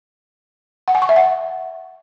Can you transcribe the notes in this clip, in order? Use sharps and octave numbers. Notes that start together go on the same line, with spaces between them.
F#5
G#5
C#6
E5
F#5